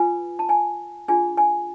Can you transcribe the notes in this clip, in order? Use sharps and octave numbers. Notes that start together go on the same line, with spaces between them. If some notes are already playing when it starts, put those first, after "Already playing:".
Already playing: F4 B4 G#5
A5
G#5
D4 F4 G#4 G#5
G#5